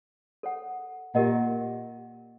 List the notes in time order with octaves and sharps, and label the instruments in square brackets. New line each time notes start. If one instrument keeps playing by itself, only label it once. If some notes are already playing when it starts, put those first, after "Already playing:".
[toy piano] A4 C#5 F#5
[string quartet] A#2 [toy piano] G4 A#4 D#5 F#5